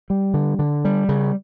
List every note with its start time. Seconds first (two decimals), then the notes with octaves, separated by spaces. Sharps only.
0.10 G3
0.34 D3
0.59 D3
0.85 G3
1.09 C#3